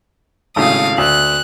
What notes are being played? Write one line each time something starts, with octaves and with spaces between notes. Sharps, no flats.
G#1 A2 C#3 F5 D#6
D2 F#6